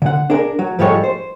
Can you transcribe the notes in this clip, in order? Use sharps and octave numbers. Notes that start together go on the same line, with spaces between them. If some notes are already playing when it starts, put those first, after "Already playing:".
D3 F#5
D4 G#4 A#4
F#3
G#2 F3 G3 G#3 A4 C#5
C5